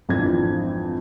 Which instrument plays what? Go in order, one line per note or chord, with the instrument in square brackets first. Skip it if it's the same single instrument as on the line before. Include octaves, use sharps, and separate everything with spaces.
[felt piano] G#1 F2 E3 D4 F4 G#6